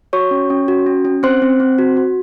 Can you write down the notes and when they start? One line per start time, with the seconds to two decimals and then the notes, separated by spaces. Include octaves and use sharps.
0.13 F#4 C#5 C#6
0.31 C#4
0.50 C#4
0.68 F#4
0.86 C#4
1.05 C#4
1.23 C4 C5 C6
1.42 C4
1.60 C4
1.79 F#4
1.97 F#4